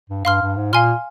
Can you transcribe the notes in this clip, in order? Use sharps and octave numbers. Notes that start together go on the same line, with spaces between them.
G2
G2 F5 C6 F6
G2
G#2
A#2 F5 G#5 C6 F6